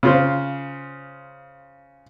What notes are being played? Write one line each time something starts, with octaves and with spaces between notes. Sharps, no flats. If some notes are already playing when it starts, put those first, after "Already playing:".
C#3 F4 C5